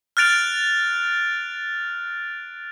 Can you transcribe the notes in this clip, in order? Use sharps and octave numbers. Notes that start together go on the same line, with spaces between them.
F6 F#6 A6 D7 F7